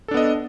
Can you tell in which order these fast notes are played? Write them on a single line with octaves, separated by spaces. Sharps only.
A4 D4 B3 D#5